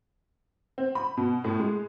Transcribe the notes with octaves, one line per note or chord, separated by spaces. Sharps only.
C4
B5
B2
A2
G#3